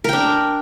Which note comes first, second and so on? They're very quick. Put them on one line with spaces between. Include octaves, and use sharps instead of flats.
A#4 G5 D4